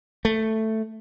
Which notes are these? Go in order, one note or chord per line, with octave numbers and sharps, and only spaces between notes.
A3